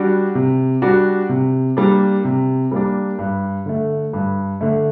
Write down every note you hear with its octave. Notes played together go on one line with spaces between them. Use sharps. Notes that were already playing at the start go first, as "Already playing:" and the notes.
Already playing: G3 D4 F#4
C3
G3 D4 F#4
C3
G3 A#3 D4
C3
G3 A#3 D4
G2
D3 A3
G2
D3 A3